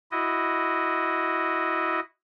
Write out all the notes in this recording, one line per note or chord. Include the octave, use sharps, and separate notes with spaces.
E4 F#4 D#5